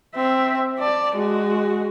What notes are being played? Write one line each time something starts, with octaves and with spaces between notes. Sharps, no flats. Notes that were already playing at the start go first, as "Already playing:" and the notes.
C4 E5
D5 A5
G#3 F#4